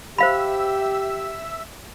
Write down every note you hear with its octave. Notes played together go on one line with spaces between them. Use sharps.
G4 C5 E5 F5 B5 E6